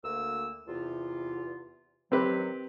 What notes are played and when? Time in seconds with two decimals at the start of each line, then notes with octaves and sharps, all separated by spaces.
0.04 D2 A#3 E6
0.68 E2 C3 F4
2.12 D#3 F#3 C4 G4 B4